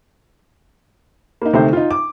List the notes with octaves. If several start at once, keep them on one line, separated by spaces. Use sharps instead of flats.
A#3 D#4
D2 C3 D#3 A3 C5
D#4 F4
D6